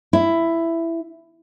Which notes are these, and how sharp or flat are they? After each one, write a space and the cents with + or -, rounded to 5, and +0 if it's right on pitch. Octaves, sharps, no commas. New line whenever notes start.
E4 +10